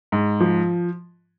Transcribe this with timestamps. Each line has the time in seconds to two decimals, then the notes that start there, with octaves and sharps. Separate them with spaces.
0.12 G#2
0.40 F3